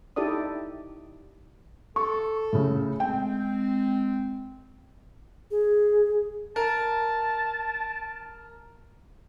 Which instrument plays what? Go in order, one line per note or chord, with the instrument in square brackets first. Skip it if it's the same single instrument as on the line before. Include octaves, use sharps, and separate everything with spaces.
[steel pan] D#4 E4 G4 A4 D5 D#6
[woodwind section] A4 [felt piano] C#6
[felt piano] A2 C#3
[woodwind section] G#3 C4 [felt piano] G5
[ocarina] G#4
[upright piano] A#4 [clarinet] A5